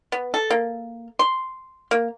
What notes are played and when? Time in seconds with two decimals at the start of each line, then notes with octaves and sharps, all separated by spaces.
0.12 B3
0.34 A4
0.51 A#3
1.19 C6
1.91 A#3